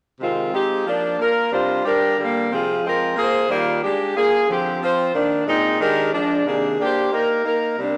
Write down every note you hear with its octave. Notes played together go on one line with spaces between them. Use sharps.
C3 D#3 G#3 C4 F4
G#3 C4 D#4 G4
F3 A#3 D4
A#3 F4 A#4
C3 G3 D4 F4 C5
G3 D4 G4 A#4
D3 G3 A#3
C3 F3 C4 F4 G#4
F3 G#3 C4 F4 A#4
A#3 F4 G#4 C5
D#3 G3 A#3 F4
G#3 D4 G4
A#3 F4 G#4
D3 F3 C4 G4
F3 C4 F4 C5
D#3 A#3 D4
A#2 G#3 C4 D#4
D#3 G#3 D4 G4 A#4
F3 G#3 D4
C3 D#3 A#3 D4 G#4
A#3 D4 G4 C5
A#3 D#4 G4 A#4
A#3 D#4 A#4
C3 G3 A#3 D4